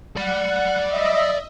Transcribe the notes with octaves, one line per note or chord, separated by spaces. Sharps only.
D5 F#5 B5
D#5 E5